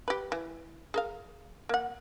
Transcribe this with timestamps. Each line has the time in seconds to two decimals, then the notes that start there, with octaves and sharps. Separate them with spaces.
0.08 G4 B4
0.32 E3
0.94 G#4 A#4 F5
1.69 A#3 F#5